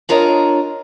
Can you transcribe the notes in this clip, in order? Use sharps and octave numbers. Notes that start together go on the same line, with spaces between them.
D4 F4 A#4 C#5 D#5